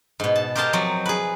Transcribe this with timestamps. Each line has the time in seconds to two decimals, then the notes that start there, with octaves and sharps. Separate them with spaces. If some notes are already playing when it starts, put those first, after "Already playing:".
0.20 G#2 B2
0.36 A5
0.55 G4 A#4 C5 D#5 F5 A5
0.73 F3 F#3 C4
1.06 G#4 B4